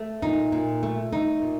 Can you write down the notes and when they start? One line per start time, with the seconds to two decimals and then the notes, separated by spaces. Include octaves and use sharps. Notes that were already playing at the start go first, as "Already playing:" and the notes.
Already playing: A3
0.22 A#2 D#4
0.52 A#2
0.83 A3
1.12 A3 D#4
1.42 A#2